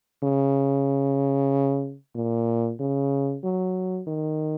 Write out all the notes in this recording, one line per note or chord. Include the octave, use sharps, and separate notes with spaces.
C#3
A#2
C#3
F#3
D#3